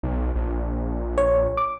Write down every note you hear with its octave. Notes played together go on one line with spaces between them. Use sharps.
B1
A#1
C#5
D6